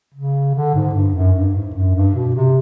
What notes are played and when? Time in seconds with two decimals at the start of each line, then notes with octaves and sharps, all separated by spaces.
0.14 C#3
0.55 D3
0.75 G#2
0.94 G2
1.15 F#2
1.35 G2
1.55 G#2
1.75 F#2
1.95 G2
2.15 B2
2.36 C3